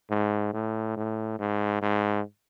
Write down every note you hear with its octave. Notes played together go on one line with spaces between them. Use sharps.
G#2
A2
A2
G#2
G#2